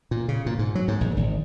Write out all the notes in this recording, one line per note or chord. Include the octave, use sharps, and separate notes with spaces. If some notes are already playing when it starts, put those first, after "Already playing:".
A#2
C#3
A#2
G#2
F#3
G#2
A#1
G#1